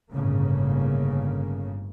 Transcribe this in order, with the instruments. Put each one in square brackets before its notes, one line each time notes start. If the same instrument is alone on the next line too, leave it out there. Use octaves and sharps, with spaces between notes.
[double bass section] G1 A2 C#3 A#3